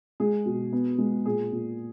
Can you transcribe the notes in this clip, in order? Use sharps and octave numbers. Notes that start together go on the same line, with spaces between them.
G#3 G#4
B2
B3
G#3
A#2 G#4
A#2